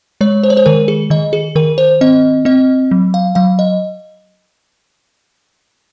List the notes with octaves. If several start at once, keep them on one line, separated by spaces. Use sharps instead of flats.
G#3 C#5
C5
C#5
C5
D#3 A#4
G#4
D#3 D#5
G#4
D#3 A#4
C5
C4 D#5
C4 D#5
F#3
F5
F#3 F5
D#5